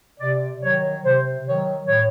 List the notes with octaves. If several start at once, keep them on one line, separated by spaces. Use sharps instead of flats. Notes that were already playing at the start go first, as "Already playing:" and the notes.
C3 D5
D#3 F#3 C#5
C3 C5
D#3 F#3 C#5
A2 C#5